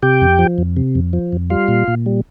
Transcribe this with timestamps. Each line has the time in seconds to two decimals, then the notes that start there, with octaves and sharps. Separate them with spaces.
0.03 C3 G4 G5
0.21 F2
0.39 F3
0.58 F2
0.77 C3
0.95 F2
1.13 F3
1.32 F2
1.50 G3 F4 F5
1.68 A#2
1.88 A#2
2.06 G3